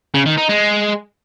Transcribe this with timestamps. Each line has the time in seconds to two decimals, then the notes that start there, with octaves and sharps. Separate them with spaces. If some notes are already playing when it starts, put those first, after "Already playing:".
0.14 C#3
0.26 D#3
0.37 D#4
0.49 G#3